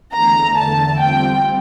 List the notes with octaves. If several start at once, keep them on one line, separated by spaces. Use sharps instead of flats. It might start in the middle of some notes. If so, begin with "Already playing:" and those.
E2 D3 A3 A#5
A5
G3 C4 F4 G5